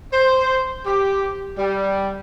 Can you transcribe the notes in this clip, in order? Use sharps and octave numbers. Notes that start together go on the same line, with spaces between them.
C5
G4
G3